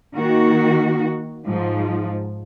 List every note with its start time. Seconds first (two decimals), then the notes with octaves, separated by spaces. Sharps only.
0.15 D#3 A#3 F#4
1.46 G#2 F3